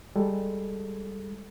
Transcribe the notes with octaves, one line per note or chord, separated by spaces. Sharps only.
G3 G#3 A4